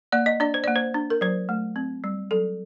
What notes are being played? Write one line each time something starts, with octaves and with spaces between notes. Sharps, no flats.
A#3 D5
D#5
D4 D5
C5
A#3 D5
C5
D4
A#4
F#3 C5
A3
C4
G3
F#3 A4